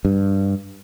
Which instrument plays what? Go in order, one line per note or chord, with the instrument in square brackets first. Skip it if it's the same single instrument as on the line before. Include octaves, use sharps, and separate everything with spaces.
[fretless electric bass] G2